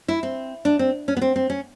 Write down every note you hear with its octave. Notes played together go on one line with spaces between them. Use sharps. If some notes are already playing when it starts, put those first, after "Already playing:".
E4
C4
D4
C4
C#4
B3
C4
C4
C#4